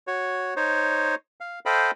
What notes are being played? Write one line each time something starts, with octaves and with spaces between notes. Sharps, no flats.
F#4 C#5
D#4 C5 C#5
F5
A4 C5 D#5 F5 G5 B5